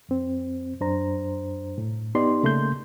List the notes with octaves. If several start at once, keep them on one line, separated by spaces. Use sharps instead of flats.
F2 C4
F#2 D4 C5 A#5
A2
B3 D#4 G4 D5 C6
C#3 A3 A#3 C6 G6